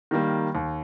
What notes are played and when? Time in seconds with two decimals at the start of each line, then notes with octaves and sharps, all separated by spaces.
0.11 D#3 G3 A#3
0.55 D#2